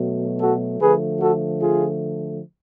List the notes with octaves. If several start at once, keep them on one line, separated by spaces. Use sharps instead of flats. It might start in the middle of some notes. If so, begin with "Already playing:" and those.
Already playing: B2 F#3 A3
F#4 A4
D3 F3 A3 G#4 B4
F#4 A4
F4 G#4